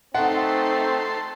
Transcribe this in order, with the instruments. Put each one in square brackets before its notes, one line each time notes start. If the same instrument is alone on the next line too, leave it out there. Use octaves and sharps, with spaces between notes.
[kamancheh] A3 D#4 [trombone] C4 [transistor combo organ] A4 C5 [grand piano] F#5